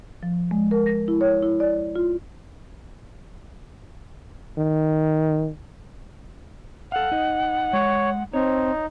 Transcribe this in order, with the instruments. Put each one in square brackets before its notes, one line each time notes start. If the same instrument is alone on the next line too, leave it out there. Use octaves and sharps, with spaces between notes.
[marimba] F3
G#3
A#4
A#6
E4
C#5
E4
D5
F4
[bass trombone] D#3
[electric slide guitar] A4 F5 [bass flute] F#5
[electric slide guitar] D#4 D#5
[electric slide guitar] G#3 [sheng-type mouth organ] C#5
[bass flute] C4 [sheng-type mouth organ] D#4 [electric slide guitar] C#5